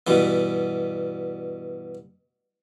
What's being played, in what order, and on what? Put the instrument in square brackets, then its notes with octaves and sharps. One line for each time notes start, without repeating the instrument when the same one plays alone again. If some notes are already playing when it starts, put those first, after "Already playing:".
[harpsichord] G2 B2 E3